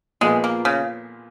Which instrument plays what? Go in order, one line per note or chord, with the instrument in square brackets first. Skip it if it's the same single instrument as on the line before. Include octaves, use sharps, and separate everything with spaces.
[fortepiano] A#2 F3 B3 F4 G#4 [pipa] G#3
[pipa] A#3
C#3